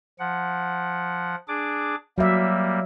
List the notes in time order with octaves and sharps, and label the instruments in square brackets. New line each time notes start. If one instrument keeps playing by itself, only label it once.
[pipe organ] F3 F#5
D4 G#4 D6
[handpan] F#3 E5 [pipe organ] G3 A#3